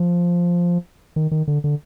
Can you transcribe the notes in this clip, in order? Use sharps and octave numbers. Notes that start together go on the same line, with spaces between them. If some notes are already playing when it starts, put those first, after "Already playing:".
Already playing: F3
D#3
D#3
D3
D3